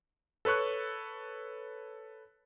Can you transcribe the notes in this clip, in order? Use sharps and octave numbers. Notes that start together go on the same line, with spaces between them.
A4 B4 C#5 C#6 F#6